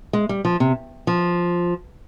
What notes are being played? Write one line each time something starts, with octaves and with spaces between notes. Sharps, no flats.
G#3
G3
F3
C3
F3